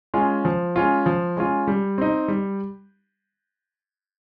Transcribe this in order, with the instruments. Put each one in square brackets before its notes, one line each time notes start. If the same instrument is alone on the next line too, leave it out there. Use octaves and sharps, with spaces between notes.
[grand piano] G#3 C#4 F4
F3
G#3 C#4 F4
F3
G#3 C#4 F4
G3
C4 D#4
G3